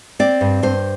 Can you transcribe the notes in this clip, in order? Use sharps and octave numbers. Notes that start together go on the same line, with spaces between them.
C4 D5
G2
G2 C5